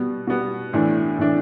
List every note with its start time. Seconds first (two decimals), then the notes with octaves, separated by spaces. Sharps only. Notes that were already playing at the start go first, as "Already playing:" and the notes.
Already playing: B2 G3 B3
0.27 B2 G3 B3
0.73 A2 E3 A3 D4
1.18 A2 E3 A3 D4